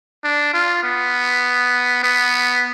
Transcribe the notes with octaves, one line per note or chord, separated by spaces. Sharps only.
D4
F4
B3
B3